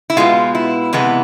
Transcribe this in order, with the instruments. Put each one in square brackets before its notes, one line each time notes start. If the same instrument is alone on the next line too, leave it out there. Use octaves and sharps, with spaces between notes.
[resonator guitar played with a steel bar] E4
B2 G#3 B3 F4
E4
C3 E3 G#3 B3